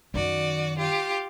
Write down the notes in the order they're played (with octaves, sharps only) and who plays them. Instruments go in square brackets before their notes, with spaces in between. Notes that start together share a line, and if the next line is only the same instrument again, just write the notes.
[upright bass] F#2 D#3 [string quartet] F#4 D5
[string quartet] F4 G4